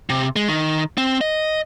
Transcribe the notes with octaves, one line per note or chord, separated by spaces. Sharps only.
C3
G#3
D#3
C4
D#5